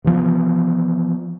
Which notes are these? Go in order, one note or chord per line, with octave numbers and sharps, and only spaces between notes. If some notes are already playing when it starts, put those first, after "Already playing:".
C3 E3 F3 B3